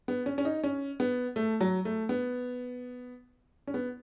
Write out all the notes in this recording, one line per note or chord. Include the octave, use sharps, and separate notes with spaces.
B3
C#4
C#4
D#4
C#4
B3
A3
F#3
A3
B3
C#4
B3